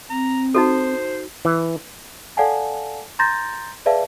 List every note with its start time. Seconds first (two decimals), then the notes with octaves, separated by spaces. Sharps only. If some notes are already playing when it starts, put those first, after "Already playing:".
0.10 C4 A#5
0.55 D#4 F#4 A4 C5
1.45 E3
2.37 A4 D5 F5 F#5 G#5 A5
3.19 A#5 C6 G6 A6 A#6
3.86 G#4 B4 D5 E5 F5 A5